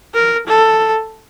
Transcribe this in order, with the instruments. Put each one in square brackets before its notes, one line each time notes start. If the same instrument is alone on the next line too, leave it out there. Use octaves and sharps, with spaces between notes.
[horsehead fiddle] A#4
A4